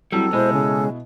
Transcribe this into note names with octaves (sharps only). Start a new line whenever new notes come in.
F#3 G3 C4 E4 A4
B2 G#3 E4 C5
C#3